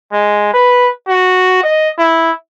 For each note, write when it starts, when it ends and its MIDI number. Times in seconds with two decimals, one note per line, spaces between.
0.12 0.50 56
0.53 0.89 71
1.08 1.60 66
1.63 1.89 75
1.98 2.31 64